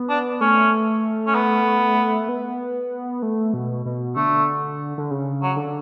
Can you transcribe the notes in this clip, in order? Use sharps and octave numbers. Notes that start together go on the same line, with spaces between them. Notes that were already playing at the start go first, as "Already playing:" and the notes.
Already playing: B3
D4
A3 C#4
C#4
B3
B3
A3
B2
B2
D3 A3
D3
C#3
F#3
D3